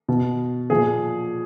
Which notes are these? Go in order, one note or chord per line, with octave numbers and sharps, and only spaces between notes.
B2
A#2 F3 G#4